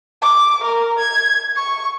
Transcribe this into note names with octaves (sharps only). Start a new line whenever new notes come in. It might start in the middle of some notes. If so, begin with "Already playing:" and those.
D6
A#4
G#6
C#6